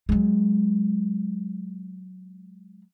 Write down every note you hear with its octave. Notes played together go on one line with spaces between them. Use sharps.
F#3 G#3